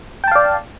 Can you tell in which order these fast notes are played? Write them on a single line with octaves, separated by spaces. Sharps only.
G5 A5 F5 D5